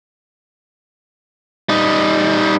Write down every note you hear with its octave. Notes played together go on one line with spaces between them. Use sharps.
G3 D#4